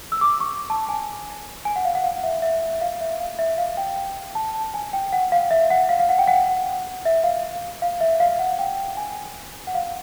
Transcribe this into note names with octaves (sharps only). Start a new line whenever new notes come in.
E6
D6
C#6
A5
G#5
G#5
F#5
F5
F#5
F5
E5
E5
E5
F5
E5
F5
E5
F5
G5
A5
G#5
G5
F#5
F5
E5
F#5
F5
F5
F#5
G5
F#5
E5
F5
F5
E5
F5
F#5
G5
G#5
F#5
F5